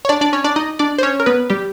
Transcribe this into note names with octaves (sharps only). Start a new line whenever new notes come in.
C#5
D4 D5
D4 D5
C#4 C#5
D4 D5
D#4 D#5
D4 D5
C5
C#4 C#5
A#4
B3 B4
G3 G4